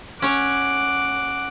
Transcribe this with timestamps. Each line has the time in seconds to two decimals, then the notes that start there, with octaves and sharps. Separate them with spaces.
0.22 C#4 C#5 F#5 D6